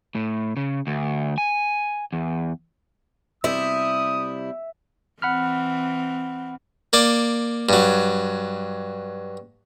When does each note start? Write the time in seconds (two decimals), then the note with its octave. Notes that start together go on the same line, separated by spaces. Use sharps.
0.15 A2
0.57 C#3
0.87 D2
1.38 G#5
2.13 E2
3.44 C3 G3 E4 E5 D#6
5.22 E3 C4 F#5 B5 F6
6.93 A#3 D5
7.69 G2 F#3